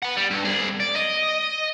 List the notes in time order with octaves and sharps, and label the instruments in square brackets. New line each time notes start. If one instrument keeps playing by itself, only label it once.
[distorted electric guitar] F#5 B5
G3
G2
C2 G#4
D5
D#5